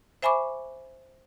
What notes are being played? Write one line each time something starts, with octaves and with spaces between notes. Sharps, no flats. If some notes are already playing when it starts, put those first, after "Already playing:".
C5 E5 G#5 B5 C#6 D6